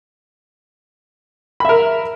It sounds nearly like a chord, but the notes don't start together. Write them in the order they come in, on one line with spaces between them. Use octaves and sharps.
B5 E5 A#4